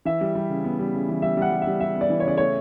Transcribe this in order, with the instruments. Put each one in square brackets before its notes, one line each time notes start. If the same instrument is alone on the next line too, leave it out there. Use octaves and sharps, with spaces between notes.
[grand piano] E3 E5
G3
G3
C#3
B3
G3
C#3
E3
G3 E5
G3 F#5
G3
E5
G3
G3 E5
B3
D5
E3
C#5
C#3 D5
A3 C#5